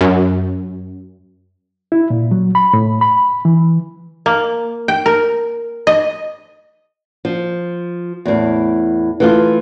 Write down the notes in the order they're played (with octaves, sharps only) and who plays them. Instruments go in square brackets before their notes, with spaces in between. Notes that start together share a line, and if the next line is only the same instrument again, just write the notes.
[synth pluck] F#2
[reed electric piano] E4
A#2
F#3
B5
A2
B5
E3
[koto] A#3
G5
A#4
D#5
[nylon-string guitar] F3
E2 A2
E3 A3 F4